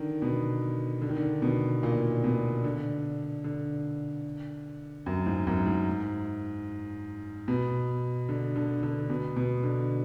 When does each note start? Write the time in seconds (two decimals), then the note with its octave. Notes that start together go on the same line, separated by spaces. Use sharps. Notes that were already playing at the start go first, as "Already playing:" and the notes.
Already playing: D3 D#3
0.22 B2
1.02 D3
1.09 D#3
1.17 D3
1.42 B2
1.83 A#2
2.24 B2
2.64 D3
3.44 D3
5.06 F#2
5.26 G#2
5.47 F#2
5.66 G#2
7.48 B2
8.29 D3
8.56 D3
8.83 D3
9.10 B2
9.36 B2
9.64 D3